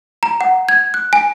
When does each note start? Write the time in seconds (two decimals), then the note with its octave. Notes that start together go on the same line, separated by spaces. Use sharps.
0.23 A#5
0.41 F#5
0.69 G#6
0.94 F#6
1.13 G#5